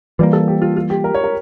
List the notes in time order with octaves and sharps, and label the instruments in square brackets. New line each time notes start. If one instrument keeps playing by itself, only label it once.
[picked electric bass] E3 G3 A#3 [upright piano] F4
[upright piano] A4
G4
F4
F4
G4
A#4
C#5
A#4